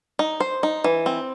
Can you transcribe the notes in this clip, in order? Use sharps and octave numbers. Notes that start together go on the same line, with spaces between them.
D#4
C5
D#4
E3
C4